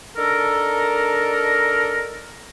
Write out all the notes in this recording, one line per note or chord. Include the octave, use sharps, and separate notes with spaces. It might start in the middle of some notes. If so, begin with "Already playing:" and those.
D4 D#4 A4 A#4